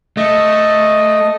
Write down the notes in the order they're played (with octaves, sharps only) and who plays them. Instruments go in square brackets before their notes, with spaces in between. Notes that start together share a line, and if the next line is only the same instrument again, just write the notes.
[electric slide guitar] A3 [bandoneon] D#5